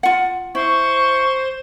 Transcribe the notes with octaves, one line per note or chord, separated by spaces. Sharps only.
F4 F#5
E4 C5 C#6